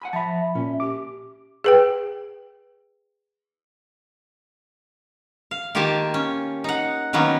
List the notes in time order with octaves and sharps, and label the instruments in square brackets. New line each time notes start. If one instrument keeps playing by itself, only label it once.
[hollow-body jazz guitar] F#5 G#5 B5
[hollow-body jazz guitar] F3 [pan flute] E5 [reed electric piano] A5 B5
[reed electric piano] A#2 [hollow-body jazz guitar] C#4 [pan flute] E5
[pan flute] G4 [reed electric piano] D6
[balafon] G#4 B4 G5
[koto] F5
D#3 A#3 F4 G4 G#5 A5
C#4
D#4 F#5
D#3 F#3 A#3 B3 C#4